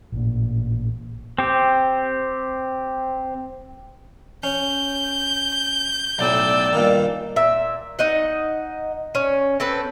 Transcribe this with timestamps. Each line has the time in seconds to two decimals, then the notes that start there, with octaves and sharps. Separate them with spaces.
0.12 A1 A#2
1.38 C4 G4
4.44 C#4 G6
6.19 B1 A2 D5 E6
6.73 G2 A#2 D#3
7.36 A#2 E5
7.99 D#4 D#5 F#5
9.15 C#4
9.60 C4 A4 B4